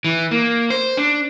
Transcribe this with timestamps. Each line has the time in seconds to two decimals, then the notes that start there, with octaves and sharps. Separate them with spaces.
0.05 E3
0.31 A#3
0.70 C5
0.97 D4